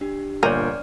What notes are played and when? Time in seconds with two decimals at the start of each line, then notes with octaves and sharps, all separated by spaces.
0.01 D4 G4
0.43 G1 A#2 D4 A#4 C#5 D5 F6 D#7